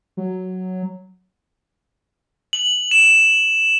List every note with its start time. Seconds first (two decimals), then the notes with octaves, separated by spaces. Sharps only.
0.17 F#3
2.53 F#7
2.91 E7